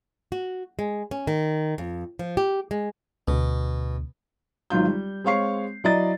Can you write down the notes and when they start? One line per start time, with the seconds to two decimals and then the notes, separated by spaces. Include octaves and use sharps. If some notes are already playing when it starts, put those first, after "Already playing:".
0.32 F#4
0.79 G#3
1.11 C#4
1.27 D#3
1.78 F2
2.19 F3
2.37 G4
2.71 G#3
3.28 D2 B2
4.70 G#1 F#3 D#4 F4 G6
4.86 G3
5.24 G#3 C4 C#5 F5 C#6 C7
5.84 F#3 E4 D5 D#5 A#5 A6